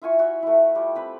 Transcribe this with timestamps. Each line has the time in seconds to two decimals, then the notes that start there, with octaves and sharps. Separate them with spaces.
0.02 E4 F4 G#5 C#6
0.19 F#4 E5
0.43 A3 E4
0.75 G3 F4
0.95 C4 B4 B5